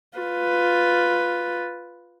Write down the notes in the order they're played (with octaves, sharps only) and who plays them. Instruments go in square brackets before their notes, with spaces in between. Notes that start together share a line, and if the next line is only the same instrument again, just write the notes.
[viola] F4 B4